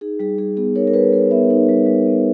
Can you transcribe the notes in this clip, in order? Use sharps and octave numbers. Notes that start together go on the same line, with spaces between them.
D#4 G#4
G3 G#4
G3 G#4
B3 G#4
D#4 A#4 C#5
A#4
G3 G#4 B4
G3 A#4 C#5
B3 C#5 E5
D#4
G3
G3
B3